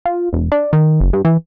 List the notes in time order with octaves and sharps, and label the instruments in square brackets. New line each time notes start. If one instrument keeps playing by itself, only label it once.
[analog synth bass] F4
E1
D4
D#3
F#1
G2
E3